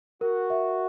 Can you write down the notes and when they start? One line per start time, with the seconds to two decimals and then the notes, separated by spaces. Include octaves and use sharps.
0.21 F#4 A#4
0.50 E5